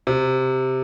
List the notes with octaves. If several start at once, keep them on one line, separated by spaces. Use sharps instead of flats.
C3